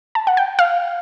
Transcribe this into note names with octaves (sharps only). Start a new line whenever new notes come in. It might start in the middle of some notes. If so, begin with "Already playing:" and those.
A5
F#5
G5
F5